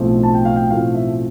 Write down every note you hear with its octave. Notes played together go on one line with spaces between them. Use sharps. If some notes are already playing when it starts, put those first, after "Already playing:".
Already playing: B1 A2 F3 A3 C4
A5
G5
F5
G5
B1 A2 F3 A3 C4 F5
E5